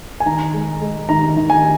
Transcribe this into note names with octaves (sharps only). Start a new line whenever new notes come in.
G#5
D#3 A#5
G#3
G#3
D#3 A#5
D#3
G#5